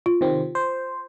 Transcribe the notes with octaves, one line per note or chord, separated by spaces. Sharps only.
F4
C3 D#3 C4
C5